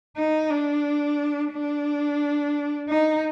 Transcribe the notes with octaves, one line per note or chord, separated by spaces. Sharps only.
D#4
D4
D4
D#4